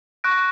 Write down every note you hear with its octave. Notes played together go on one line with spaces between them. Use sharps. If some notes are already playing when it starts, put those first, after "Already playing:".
C#6 F#6 A#6 D7